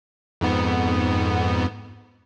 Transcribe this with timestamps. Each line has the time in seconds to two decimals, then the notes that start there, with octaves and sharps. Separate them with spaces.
0.41 F2 G#2 B3